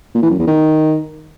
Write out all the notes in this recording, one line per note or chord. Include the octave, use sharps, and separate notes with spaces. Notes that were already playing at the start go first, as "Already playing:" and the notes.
A#2
E3
F#2
E2
D#3